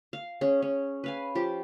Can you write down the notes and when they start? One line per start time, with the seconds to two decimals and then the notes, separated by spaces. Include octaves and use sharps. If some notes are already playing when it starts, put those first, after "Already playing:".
0.13 F5
0.41 C#4 G#4
0.62 C#4
1.04 B4 F5 G#5
1.35 F3 G4